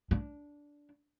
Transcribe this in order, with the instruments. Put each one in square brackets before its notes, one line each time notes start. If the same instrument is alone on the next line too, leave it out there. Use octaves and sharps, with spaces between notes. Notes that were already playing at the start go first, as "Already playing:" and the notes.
[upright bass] D4